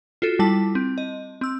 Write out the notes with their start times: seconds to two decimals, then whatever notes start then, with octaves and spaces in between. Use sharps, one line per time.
0.22 F4 F#4 A4
0.39 G3 E4 A5
0.75 C4
0.98 D#5
1.41 C4 E6